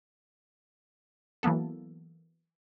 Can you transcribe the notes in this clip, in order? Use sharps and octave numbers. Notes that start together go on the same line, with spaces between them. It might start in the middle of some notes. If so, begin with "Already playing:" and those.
E3 F#3 A#3 B3 A4